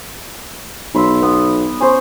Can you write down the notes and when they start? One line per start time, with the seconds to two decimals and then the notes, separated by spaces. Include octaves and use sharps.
0.95 B1 B5 C6 E6
1.22 B3
1.80 C#4 C5